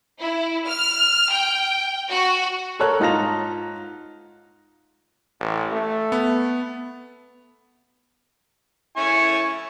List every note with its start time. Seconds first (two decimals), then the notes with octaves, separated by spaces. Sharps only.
0.19 E4
0.66 F6
1.30 G5
2.10 F#4
2.80 A4 A#4 C#5 F#6
3.00 G#2 D#4 F4 A5 A#6 F7
5.40 A1
5.72 A3
6.12 B3
8.97 E4 G#5 C#6